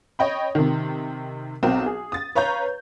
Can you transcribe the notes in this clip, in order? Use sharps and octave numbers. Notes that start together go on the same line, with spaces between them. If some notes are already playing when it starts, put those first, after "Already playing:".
C#5 D#5 G5 B5
C3 D#3
B1 C4 F#4 A#4
G#4
D#6 A6
B4 C#5 F5 A#5 G6